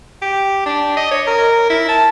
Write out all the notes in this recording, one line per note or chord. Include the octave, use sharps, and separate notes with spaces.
G4
D4
D#5
C#5
A#4
E4
A5